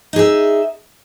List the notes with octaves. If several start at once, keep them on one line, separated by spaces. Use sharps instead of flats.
D#4 G#4 E5